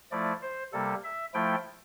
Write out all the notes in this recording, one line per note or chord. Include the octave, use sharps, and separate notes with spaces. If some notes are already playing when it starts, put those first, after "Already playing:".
F3 A3 E4 D5
C5
C3 G3 A#3 A4
E5
F3 A3 E4 G5